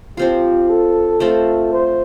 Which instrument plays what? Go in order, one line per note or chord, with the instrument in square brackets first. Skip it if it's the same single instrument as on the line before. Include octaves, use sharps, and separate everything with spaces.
[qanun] F3 C4 F4 [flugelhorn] G4
[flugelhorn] A4
[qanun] A3 C4 F4 [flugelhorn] A4
[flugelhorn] C5